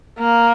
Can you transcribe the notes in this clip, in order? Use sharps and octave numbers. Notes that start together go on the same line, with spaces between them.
A#3